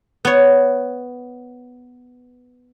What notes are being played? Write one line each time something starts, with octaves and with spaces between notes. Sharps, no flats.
B3 C#5